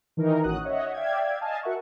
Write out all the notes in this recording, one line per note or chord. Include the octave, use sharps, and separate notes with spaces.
D#3 E3 D#4 A#4
A1 D#3 C#4 F#4 D#6 F#6
C#5 D#5 E5 F#5
D5 E5 F5 G5 G#6
D#5 F5 G#5 A5
F#4 A#4 E5 F#5 C#6